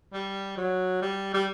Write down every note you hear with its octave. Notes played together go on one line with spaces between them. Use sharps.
G3
F#3
G3
G3